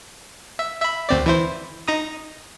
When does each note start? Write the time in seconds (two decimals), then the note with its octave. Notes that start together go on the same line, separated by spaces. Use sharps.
0.59 E5
0.82 E5 B5
1.09 D2 C4 D5
1.26 E3 E4 C5
1.88 D#4 A#5 D#6